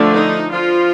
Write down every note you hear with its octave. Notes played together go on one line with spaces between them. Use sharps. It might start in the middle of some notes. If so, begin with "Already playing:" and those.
Already playing: D3 F3 A3 D4
D#4
F3 F4